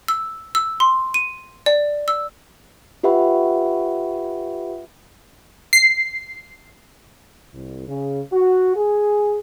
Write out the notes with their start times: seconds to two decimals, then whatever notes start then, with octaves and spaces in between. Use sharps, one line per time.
0.08 E6
0.55 E6
0.80 C6
1.14 D#7
1.66 D5
2.08 E6
3.03 F4 G4 B4 E5 F#5 B5
5.73 C7
7.52 C2
7.87 C#3
8.32 F#4
8.75 G#4